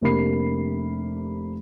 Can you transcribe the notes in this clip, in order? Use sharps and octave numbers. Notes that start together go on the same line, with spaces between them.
F1 C3 A#3 D4 B5 C7